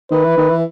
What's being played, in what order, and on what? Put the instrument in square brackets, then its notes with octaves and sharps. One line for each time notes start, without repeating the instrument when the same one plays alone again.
[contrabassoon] D#3 [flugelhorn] B4
[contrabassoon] E3
D#3
E3